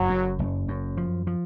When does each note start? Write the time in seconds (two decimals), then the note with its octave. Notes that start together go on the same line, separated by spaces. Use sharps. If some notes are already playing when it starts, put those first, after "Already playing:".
Already playing: F#1 F#3
0.09 F#2
0.39 F#1
0.68 F#2
0.97 F3
1.27 F3